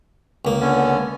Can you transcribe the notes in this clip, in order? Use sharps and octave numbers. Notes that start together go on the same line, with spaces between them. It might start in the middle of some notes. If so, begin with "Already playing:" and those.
C#2 A#3
D3 B3 C#4